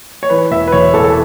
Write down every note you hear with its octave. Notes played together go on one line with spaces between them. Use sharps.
C#5
E3 B4
E1 E5
B4
E1 C#5
E2 A4
A4